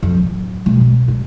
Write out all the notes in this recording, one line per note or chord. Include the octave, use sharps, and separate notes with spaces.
F2
D1
B1
B2
G2